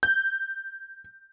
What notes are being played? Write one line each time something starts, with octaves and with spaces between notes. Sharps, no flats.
G6